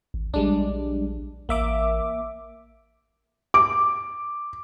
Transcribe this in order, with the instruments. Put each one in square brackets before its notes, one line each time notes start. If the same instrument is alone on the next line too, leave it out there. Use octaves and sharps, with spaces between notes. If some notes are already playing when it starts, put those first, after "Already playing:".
[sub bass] G#1
[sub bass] A#1 [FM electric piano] G3 G#3 D4
[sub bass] A1 [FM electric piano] A#3 E5 D6
[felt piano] D6